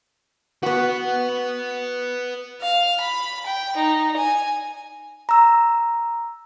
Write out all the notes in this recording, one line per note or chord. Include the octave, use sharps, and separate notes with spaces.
B3 F#4 B4 F#5
F5
B5
G5
D#4
G#5
A#5 E6